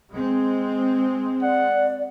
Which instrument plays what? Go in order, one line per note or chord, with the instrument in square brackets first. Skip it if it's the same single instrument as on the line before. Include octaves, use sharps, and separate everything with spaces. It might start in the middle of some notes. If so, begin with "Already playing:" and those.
[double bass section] G#3 C4
[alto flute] D5 [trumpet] F#5